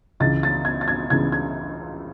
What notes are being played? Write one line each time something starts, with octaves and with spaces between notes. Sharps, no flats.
C#2 C#3 E3 A6
A6
G#6
A6
G#6
C#2 C#3 E3 G#6
G#6